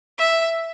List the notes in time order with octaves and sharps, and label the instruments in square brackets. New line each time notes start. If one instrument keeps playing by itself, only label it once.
[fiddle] E5